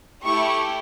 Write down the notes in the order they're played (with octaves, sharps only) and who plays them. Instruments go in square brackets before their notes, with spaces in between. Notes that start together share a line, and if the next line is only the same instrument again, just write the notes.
[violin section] A3 E4 G4 C#6